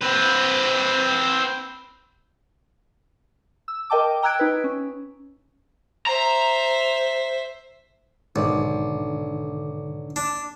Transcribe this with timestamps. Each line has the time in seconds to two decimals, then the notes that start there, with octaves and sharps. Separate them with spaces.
0.01 C4 B4
3.68 E6
3.90 A#4 D#5 G5 A5 D6
4.22 G5 A#5 E6 F#6 G#6 D7
4.39 D#4 B4
4.64 C#4
6.06 C5 E5 A#5
8.36 B1 G#2 D3 D#3 D5
10.16 D4